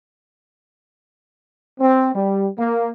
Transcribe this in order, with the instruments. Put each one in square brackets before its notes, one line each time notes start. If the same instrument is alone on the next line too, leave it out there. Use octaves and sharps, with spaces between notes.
[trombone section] C4
G3
A#3